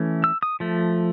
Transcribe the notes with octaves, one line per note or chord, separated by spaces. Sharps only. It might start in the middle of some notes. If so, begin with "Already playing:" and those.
Already playing: E3 A3 C#4
E6
D#6
F3 A3